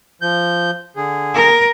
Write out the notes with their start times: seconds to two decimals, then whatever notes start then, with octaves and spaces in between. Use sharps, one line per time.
0.22 F3 G6
0.96 D3 G#4
1.34 A#4